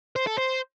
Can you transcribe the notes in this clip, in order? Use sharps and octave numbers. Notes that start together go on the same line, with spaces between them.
C5
A4
C5